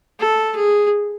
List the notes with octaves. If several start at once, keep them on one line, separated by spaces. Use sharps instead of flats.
A4
G#4